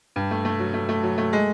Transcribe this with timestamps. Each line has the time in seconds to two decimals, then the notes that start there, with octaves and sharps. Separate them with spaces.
0.16 G2
0.31 A3
0.45 A3
0.59 F#3
0.74 A3
0.89 A3
1.03 F#3
1.18 A3
1.33 G#3